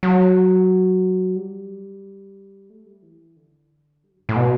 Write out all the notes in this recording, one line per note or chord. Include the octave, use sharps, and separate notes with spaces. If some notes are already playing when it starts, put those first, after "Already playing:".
F#3
G3
A3
G3
E3
D3
G3
F#3
G2
A2
B2